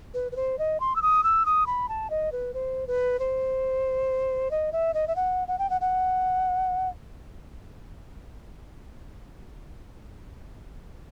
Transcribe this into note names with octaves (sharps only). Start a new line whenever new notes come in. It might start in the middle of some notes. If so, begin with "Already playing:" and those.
B4
B4
C5
D#5
C6
E6
D#6
E6
D#6
B5
A5
D#5
B4
C5
B4
C5
D#5
E5
D#5
E5
F#5
F#5
G5
F#5
F#5